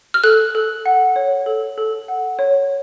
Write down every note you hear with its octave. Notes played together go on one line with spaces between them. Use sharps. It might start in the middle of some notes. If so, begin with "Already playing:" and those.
F6
A4 F#6
A4
F#5
C#5
A4
A4
F#5
C#5